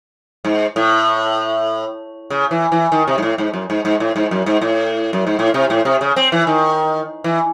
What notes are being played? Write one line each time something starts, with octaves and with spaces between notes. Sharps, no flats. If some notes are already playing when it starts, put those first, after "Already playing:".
G#2
A2
C#3
E3
E3
D#3
C3
G#2
A2
G#2
F#2
G#2
G#2
A2
G#2
F#2
G#2
A2
F#2
G#2
A2
C3
A2
C3
C#3
C4
E3
D#3
E3